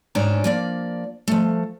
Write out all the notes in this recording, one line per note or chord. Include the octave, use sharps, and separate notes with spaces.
G#2 C#4 D4 A#5
F3 A#3 D5
F3 A3